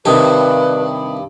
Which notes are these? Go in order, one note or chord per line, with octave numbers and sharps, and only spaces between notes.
G2 C3 D#3 G4 B4 A5 D#6